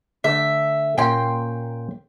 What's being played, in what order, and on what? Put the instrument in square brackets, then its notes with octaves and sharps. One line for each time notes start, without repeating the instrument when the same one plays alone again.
[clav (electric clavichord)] D3 A3 [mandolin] E5
[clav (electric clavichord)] A#2 A#3 C#4 [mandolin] G5 C6